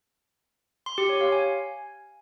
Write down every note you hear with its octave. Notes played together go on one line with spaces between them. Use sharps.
C6
G4
C#5
F5
G#5